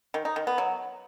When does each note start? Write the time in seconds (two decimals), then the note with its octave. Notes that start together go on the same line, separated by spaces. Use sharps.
0.14 D#3
0.25 D#4
0.36 D#3
0.47 B3
0.58 F#3